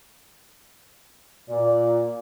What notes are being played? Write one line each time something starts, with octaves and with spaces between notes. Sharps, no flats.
A#2 D5